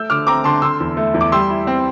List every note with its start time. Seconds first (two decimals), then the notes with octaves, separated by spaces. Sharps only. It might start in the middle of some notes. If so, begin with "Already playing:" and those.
Already playing: A3 E6 G6
0.10 D3 D6 F6
0.27 C4 A#5 D6
0.44 D3 A5 C6
0.62 D3 C6 E6
0.80 E2
0.97 A3
1.14 E2
1.21 D6
1.32 G3 C6 E6
1.50 E4
1.67 C4